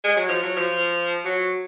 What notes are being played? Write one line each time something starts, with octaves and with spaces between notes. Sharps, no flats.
G#3
F#3
F3
F#3
F3
F#3